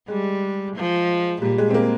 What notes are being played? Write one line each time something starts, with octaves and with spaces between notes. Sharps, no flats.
G3 G#3
F3
A#2 G3
G#3
C4
A#3